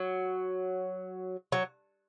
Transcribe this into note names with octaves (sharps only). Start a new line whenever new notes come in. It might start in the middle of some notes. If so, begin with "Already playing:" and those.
Already playing: F#3
F#3